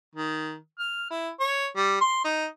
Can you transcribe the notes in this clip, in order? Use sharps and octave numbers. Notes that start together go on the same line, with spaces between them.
D#3
F6
E4
C#5
G3
C6
D#4